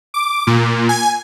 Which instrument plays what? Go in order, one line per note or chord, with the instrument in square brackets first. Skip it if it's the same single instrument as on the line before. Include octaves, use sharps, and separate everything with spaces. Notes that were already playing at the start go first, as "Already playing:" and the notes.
[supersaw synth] D6
A#2
G#5